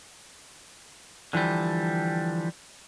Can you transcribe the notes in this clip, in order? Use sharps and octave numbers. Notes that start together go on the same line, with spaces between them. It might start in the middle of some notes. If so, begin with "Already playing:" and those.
D3 E3 F3 G3